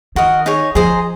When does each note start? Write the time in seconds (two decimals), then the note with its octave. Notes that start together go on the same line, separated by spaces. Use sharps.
0.16 D#3 F#4 A#4 D#5
0.46 D#4 G#4 C#5
0.75 F3 G#4 C5 D#5 A#5